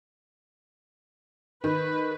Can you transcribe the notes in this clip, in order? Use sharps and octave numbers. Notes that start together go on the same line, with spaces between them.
D#3 B4